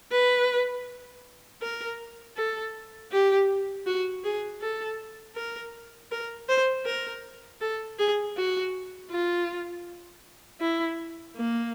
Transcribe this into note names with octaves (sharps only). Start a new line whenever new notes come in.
B4
A#4
A4
G4
F#4
G#4
A4
A#4
A#4
C5
A#4
A4
G#4
F#4
F4
E4
A#3